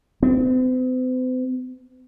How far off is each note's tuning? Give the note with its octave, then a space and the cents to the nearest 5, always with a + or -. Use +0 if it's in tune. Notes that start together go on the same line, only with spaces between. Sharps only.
C4 -45